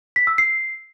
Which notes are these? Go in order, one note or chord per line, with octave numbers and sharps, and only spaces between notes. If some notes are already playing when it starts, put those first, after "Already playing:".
B6
E6
C7